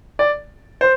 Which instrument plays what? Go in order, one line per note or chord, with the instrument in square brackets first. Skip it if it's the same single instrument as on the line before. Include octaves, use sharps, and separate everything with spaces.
[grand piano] D5
C5